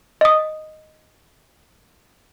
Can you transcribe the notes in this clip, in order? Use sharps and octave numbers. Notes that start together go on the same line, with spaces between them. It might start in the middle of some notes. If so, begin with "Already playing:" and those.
D#5 D#6